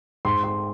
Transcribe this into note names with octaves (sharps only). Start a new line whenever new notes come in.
G#2 C6
C6